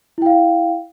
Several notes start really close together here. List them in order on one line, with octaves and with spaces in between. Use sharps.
E4 G5 F5